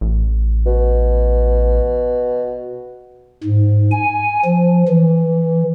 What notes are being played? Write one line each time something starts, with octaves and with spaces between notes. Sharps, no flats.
A1
B2
G#2
G#5
F3
E3